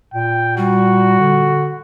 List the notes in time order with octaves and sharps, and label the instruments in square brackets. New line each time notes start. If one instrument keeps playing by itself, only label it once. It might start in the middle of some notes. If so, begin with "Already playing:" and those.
[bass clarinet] A#2 [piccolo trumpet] G5
[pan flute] G3 [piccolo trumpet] F#4
[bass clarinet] D3